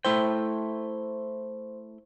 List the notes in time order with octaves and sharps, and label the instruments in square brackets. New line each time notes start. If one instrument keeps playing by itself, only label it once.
[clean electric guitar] A3 E4 G5 [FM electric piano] C5